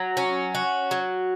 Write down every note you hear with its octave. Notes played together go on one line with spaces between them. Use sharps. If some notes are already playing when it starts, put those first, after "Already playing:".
Already playing: F#3
C#4
F#4
F#3